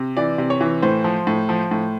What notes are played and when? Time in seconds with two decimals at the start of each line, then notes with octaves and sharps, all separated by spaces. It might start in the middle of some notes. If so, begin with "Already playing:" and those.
Already playing: C3
0.17 E3 D5
0.38 C3
0.50 C#5
0.61 E3
0.82 A2 C5
1.04 F3
1.27 A2
1.49 F3
1.71 A2